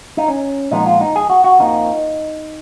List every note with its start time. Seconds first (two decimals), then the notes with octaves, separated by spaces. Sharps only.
0.17 D#4
0.28 C#4
0.71 A#2 F3 G#3 B3 D#4
0.86 F4
1.01 D#4
1.16 G#4
1.30 F#4
1.44 F#4
1.59 F2 F3 A#3 D#4